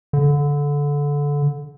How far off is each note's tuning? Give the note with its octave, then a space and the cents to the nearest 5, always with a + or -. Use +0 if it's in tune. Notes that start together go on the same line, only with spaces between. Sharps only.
D3 -20